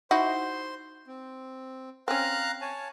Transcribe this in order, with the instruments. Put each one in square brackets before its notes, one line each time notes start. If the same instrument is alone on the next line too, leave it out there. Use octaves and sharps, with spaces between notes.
[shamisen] D#4 E4 F#4 [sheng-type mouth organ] C5 C6
[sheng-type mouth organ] C4
[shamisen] C4 C#4 [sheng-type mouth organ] F5 A#5 F#6
[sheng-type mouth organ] C#5 G#5 A5